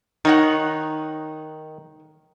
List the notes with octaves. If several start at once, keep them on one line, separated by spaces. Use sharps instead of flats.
D#3 D#4 C#5 F#5